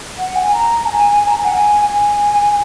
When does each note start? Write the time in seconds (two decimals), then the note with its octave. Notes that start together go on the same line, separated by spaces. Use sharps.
0.18 F#5
0.36 G#5
0.52 A#5
0.86 G#5
1.19 G#5
1.27 A#5
1.35 G#5
1.45 F#5
1.52 G#5
1.86 G#5